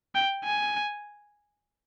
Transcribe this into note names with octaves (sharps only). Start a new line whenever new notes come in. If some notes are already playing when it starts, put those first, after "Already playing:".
G5
G#5